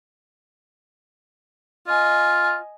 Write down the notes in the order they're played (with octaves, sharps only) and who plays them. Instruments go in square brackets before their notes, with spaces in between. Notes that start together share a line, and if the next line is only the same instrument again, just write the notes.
[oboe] F4 [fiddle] D#5 G#5